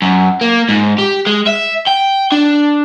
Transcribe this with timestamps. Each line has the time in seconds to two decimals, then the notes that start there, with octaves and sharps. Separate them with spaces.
0.02 F#2
0.41 A#3
0.69 G#2
0.98 G4
1.26 G#3
1.47 E5
1.87 G5
2.32 D4